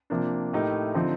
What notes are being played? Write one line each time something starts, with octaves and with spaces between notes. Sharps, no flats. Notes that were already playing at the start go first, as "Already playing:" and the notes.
C3 F3 A#3 D4
A2 A3 D#4 G4 A#4
D3 F3 C4 D#4